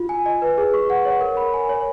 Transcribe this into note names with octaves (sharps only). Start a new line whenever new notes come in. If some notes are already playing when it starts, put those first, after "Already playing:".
Already playing: F4
G#5
D#5
B4
G#4
C#6
F#5
C#5
A#4
B5
G#5
C#5